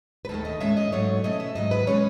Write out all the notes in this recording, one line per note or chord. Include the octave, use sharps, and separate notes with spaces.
B4
D#2 D#3 A3 A4
D#5
A2 G#3 C#4 E5
D#5
G#2 F#3 A3 C#5
B2 A3 C#4 D#5
E5
G#2 D#3 F#3 D#5
B4
B2 G#3 C#4 C#5